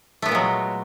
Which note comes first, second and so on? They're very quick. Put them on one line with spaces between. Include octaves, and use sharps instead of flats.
A3 B3 A#2 G#3 F#3